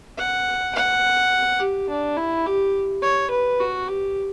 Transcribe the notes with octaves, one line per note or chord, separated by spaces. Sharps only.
F#5
F#5
G4
D4
E4
G4
C#5
B4
F#4
G4